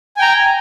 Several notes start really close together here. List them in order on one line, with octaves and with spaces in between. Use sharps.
G#5 G5 A#5